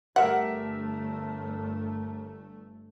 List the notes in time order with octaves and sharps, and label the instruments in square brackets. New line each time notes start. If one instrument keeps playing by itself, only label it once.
[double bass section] G1 G2 A3 [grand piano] G4 A#4 E5 [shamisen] F#5